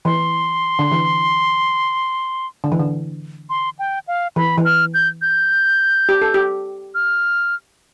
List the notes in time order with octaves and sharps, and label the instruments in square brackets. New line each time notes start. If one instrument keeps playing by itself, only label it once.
[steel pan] E3 [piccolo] C6
[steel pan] D3
E3
D3
E3
D3
[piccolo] C6
G5
F5
[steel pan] E3 [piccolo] B5
[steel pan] E3
[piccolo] F6
G6
G6
[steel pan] G4
A4
G4
[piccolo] F6